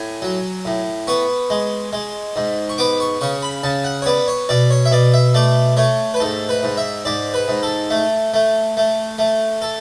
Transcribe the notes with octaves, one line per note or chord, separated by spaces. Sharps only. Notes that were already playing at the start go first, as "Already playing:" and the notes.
Already playing: A2 G#5
F#3
A2
B3 C#6
G#3
G#3
G#2
C#6
B3 D6
C#6
C#3 C#6
B5
C#3 A5
F#5
C#5
B3 D5
C#5
B2 D5
C#5
E5
B2 D5
E5
A3 D5
A3 C#5
B4
G#2 A4
B4
G#2
E5
G#2 D5
B4
G#2
A4
A3
A3
A3
A3
A4